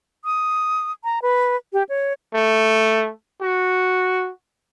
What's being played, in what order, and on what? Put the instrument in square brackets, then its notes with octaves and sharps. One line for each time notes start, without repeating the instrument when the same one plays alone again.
[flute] D#6
A#5
B4
G4
C#5
[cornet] A3
F#4